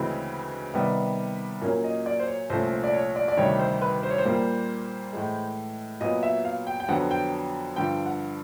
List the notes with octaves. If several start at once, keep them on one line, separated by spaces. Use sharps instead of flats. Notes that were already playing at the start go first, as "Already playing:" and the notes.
Already playing: D2 C#3 E3 G#3 C4 B4
C3 D#3 G3 B3
A#2 F#3 A#3 C#4 A#4
D#5
D5
C5
C#5
C2 A#2 F3 A3 C#4 C5
C5
D5
C#5
D5
D5
D2 C3 D#3 G3 C#5
C5
B4
C5
C#5
C5
A#2 G3 A#3
A2 E3 G#3
A#2 F#3 B3 D#5
E5
F5
G5
G5
F2 D3 F#3 B3 F#5
G5
G2 D3 F3 G5
F#5